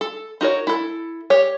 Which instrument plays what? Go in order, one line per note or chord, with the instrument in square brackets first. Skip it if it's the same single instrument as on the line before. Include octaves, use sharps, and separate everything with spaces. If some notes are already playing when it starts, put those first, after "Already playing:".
[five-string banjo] A4
D#4 F#4 A#4 C#5
E4 A4
G4 C#5